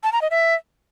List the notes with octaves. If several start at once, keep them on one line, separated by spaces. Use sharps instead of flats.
A5
A#5
D#5
E5